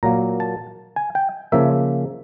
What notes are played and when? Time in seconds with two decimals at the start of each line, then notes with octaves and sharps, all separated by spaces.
0.03 A#2 F#3 A#3 A#5
0.40 A5
0.96 G#5
1.15 G5
1.52 C#3 F3 A#3 E5